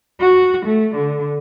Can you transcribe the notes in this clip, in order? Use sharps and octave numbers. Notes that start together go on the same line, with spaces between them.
F#4
A3
D3